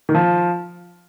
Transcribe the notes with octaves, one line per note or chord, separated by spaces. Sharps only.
D#3
F3